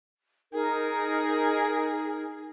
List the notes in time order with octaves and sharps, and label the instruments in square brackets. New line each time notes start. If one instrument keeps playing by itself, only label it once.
[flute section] D#4 A#4 [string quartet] G#4